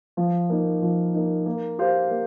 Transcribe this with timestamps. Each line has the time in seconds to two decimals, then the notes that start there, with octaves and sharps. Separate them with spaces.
0.17 F3
0.49 A#3 D#4
0.82 F3
1.14 A#3 D#4
1.46 A#3
1.79 G4 C5 F5
2.10 A#3